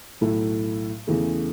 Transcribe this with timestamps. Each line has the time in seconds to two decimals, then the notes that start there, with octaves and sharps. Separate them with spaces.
0.21 B1 A2 F#3 A3 E4
1.07 E2 C#3 E3 A3